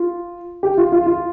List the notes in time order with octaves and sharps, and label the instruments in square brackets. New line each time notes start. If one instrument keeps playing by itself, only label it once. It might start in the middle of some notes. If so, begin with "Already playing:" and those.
Already playing: [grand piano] F4
G4
F4
F4
F4